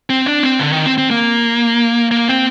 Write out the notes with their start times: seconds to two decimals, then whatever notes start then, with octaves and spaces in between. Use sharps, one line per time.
0.10 C4
0.26 D4
0.43 C4
0.59 D3
0.72 D#3
0.86 C4
0.98 C4
1.11 A#3
2.11 A#3
2.28 C4